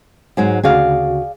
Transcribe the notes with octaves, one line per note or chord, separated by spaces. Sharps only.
G#2 F#3 G#3
D2 C#3 F#4 G#4 D5 F5